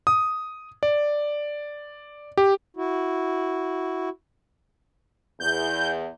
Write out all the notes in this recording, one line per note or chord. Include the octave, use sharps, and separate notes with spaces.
D#6
D5
G4
E4 F#4
E2 G6